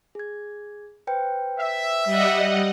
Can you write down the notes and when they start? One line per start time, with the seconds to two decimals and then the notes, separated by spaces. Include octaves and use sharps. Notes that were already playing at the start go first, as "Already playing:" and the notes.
0.15 G#4 G#6
1.07 B4 C5 G5
1.58 E5
2.05 G3 D#5 F#5 E6